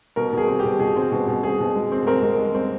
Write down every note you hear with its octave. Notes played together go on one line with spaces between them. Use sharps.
B2 A#4
B2 G#4
C4
G4
B2
B2 G#4
C4
B2
B2
C4 G#4
B2
G#3
C4
C4 A#4
G#3
G#3
C4